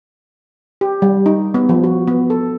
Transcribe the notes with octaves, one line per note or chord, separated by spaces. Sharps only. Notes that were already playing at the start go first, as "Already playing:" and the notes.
G4
G3
D#4
B3
F3
F#4
B3
A4